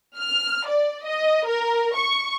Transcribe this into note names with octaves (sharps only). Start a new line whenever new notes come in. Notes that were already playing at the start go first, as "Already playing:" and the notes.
F6
D5
D#5
A#4
C#6